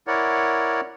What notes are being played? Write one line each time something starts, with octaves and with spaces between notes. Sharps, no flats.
E4 A#4 C#5 D5 F#5